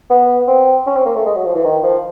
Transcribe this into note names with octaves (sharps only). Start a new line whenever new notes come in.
B3
C4
C#4
C4
A#3
A3
G#3
F#3
F3
E3
D#3
F3